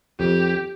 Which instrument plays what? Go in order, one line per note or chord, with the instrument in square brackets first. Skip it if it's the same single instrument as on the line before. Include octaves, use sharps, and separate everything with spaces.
[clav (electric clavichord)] F2 [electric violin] G4